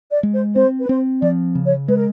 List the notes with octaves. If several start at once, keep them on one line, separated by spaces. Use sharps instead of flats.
D5
G#3
C5
C4 C5
B4
C4 C5
F3 D5
C#3
C#5
G#3 B4
A#4